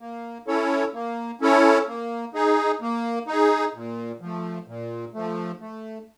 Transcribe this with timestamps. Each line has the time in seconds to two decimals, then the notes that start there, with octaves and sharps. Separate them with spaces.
0.01 A#3
0.47 C#4 E4 A4 C#5
0.94 A#3
1.41 C#4 E4 A4 C#5
1.88 A#3
2.34 D#4 G#4
2.82 A#3
3.27 D#4 G#4
3.75 A#2
4.21 F3 A3
4.68 A#2
5.14 F3 A3
5.61 A3